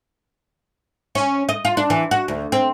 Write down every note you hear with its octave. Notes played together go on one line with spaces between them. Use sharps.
C#4
D#5
F4
D4
E3
F#4
D2
C4